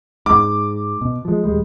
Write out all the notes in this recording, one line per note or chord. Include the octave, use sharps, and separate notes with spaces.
G#2 D6
B2
F3 G#3
D#1 G3 G#3